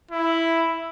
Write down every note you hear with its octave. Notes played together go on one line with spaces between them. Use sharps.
E4